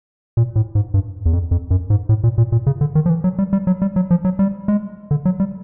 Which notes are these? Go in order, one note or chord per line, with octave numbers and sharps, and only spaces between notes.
A#2
A2
G#2
G2
E2
F2
F2
F#2
G#2
A2
A#2
A#2
A#2
C#3
D3
D#3
F3
E3
F#3
G3
G3
F#3
G3
F#3
F3
F#3
G3
G#3
D3
F#3
G3